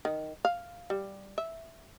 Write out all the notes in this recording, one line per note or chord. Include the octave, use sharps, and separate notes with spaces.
D#3
F5
G3
E5